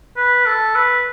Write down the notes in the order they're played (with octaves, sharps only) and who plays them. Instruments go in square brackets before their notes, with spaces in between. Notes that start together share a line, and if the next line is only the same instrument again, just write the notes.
[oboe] B4
A4
B4